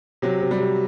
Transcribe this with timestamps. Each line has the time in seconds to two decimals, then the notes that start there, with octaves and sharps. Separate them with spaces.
0.22 C3 F#3
0.41 C3
0.51 G3
0.60 C3